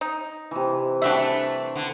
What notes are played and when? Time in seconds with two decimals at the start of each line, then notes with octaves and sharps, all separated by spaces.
0.01 D#4
0.51 C3 E3
1.02 G3 A3 D4 F#4 E5
1.76 D3